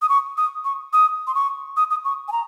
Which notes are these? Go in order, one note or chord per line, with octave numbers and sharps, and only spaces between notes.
D#6
C#6
D#6
C#6
D#6
C6
C#6
D#6
D#6
C#6
G#5
A#5